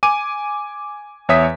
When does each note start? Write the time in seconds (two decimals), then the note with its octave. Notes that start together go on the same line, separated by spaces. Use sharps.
0.03 G#5 D6 D#7
1.29 E2 C#5 E5 D#6 B6